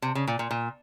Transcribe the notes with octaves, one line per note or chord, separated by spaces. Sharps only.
C3
C#3
A#2
A#2
A#2